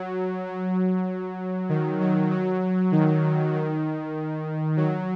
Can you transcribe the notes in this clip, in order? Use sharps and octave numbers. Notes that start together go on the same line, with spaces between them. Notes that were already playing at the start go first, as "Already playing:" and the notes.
Already playing: F#3
F#3
D#3
F#3
F#3
D#3
D#3
F#3